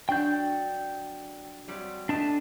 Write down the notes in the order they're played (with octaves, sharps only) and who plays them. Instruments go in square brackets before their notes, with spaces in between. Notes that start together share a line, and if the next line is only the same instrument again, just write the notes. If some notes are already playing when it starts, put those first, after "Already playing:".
[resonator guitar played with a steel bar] F#3 D4 F#4 [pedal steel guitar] G5 G6
[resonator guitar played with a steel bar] F2 F#3 G3
[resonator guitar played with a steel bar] A2 D#5 [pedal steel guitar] D4 A5